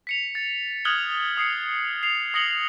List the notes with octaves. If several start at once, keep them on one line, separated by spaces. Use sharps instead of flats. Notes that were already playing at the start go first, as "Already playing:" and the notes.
B6 C#7 F7
A6
D#6 F6 F#6 G#6 F#7 G7
D#6 C7 C#7
C7 F7
D#6 A#6 C#7 F#7 G7